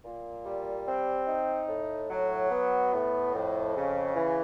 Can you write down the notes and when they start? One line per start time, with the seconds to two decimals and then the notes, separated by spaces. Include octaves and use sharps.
0.04 A#2
0.45 G3
0.86 C4
1.27 D#4
1.68 A2
2.09 F#3
2.51 B3
2.92 A2
3.34 F2
3.75 C#3
4.16 E3